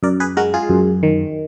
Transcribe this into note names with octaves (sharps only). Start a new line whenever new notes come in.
F#2 A#4 D5
G#4 B4
G#3 F#4 A#4
F4 G#4
F#2
D#3